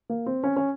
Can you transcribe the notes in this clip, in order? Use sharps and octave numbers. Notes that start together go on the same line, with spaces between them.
A#3
C4
C#4
C#4